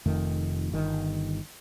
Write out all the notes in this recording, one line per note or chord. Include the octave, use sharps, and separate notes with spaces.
F1 F2 D#3 A3
G1 D#3